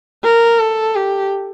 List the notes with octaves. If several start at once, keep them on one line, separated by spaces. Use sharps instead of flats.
A#4
A4
G4